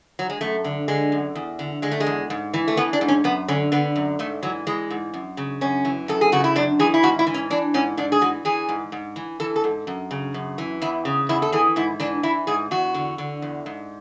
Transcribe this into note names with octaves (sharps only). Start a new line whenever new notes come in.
F#3
G#3
F#2 A3
D3
D3 G#3
F#2
E2
D3
D3 G#3
A3
G#3
E2
G#2
E3
A3
E3 B3
D4
G#2
C#4
F#2 B3
D3 C#4
D3 B3
F#2
G#2 A3
E3 F#3
E3 G#3
G#2
F#2
C#3
F#2 C#4
E3
F#2 A4
G#4
C#3 F#4
E4
F#2 D4
E3 G#4
E4
G#2 F#4
E4
E3
C#4
E3 D4
G#2 C#4
G#2 D4
G#4
E3 F#4
E3 G#4
G#2
G#2
E3
E3 A4
A4
G#2
F#2
C#3
F#2
E3
E2 E4
C#3
E2 E4
A4
E3 G#4
G#2 E4
E3 D4
E3 E4
G#2 G#4
E2 F#4
D3
D3
E2
G#2